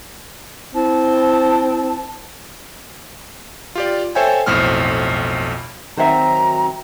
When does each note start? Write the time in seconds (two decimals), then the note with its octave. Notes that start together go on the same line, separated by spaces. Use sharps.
0.75 C4 E4 A5
3.75 F4 G4 D5
4.15 A4 C5 C#5 E5 G5 G#5
4.46 B1 F2 A2 C5 F6
5.97 D#3 F#3 C4 C5 E5 A#5